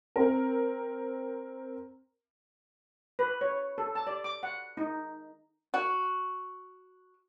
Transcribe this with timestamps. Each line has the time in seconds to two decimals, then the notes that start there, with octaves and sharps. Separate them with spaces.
0.16 C4 A#4
3.19 B4
3.41 C#5
3.78 A4
3.95 A5
4.07 D5
4.24 D6
4.43 F#5
4.77 D#4
5.74 F#4